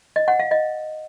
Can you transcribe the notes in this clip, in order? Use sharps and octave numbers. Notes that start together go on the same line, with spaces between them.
D#5
F#5
F5
D#5